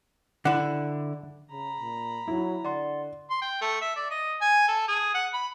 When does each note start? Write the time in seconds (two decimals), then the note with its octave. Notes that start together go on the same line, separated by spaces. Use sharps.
0.45 D3 E4 F#5
1.52 C#3 A#5 B5
1.80 A#2
2.28 F#3 E4
2.65 D3 D5 F#5 C6
3.30 C6
3.42 G5
3.61 A3
3.81 E5
3.96 D5
4.11 D#5
4.41 G#5
4.68 A4
4.88 G#4
5.15 F#5
5.34 B5